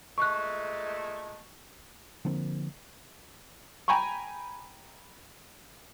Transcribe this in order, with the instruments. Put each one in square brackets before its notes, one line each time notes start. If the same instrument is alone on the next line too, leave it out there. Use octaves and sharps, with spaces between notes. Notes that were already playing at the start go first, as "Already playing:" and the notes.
[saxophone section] A#2 G#3 A3 [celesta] C#6 F#6
[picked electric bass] D3 F3 A#3 C4
[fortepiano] G5 G#5 A#5 B5 C#6